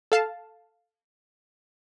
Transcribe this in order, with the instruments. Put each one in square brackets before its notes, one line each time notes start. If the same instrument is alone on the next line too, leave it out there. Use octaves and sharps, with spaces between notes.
[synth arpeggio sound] A4 F5 A5